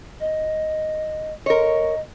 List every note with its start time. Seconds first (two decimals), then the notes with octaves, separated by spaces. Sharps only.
0.20 D#5
1.46 A#4 C#5 D#5